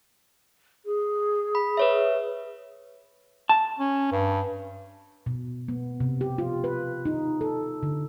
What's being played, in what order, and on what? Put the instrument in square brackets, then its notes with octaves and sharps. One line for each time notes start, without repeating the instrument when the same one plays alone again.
[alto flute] G#4
[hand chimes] B5
B4 C#5 E5
[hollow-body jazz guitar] A5
[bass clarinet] C#4
G2
[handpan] B2
B3
C3
G4
F4
B4
D#4
A4
D3